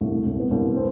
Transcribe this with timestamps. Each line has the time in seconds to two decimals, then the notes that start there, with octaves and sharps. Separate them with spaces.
0.01 C2 A3
0.26 C2
0.39 B3
0.51 C2
0.76 C4